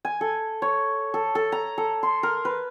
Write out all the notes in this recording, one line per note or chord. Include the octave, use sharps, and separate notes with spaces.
G#5
A4
C#5
A4
A4
A#5
A4
C6
A#4
B4